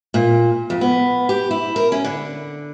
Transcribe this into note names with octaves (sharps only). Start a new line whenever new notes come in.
A#2
F2
B3
G4
E4
A#4
C#4
D3